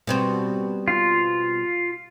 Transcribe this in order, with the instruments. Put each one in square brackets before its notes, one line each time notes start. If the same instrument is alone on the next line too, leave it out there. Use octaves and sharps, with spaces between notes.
[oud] B2 G3 C4
[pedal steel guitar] F4